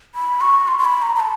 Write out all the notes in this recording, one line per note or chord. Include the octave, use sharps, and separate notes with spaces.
B5
C#6
C6
C6
B5
A#5
A#5
A5